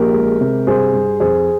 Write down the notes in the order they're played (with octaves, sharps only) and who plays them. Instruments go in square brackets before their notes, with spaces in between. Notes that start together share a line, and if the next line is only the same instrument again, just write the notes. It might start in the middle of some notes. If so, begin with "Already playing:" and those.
Already playing: [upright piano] A#1 G4 A#4
G#3
C3
G2 G#4 C5
G2
F2 G#4 C5